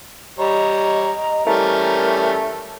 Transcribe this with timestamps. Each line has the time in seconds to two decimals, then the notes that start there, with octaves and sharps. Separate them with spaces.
0.39 G3 C#5 D#5 A#5
1.47 E3 G3 A3 C#4 A#4